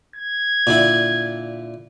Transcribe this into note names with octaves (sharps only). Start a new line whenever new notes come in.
G#6
A#2 D3 E4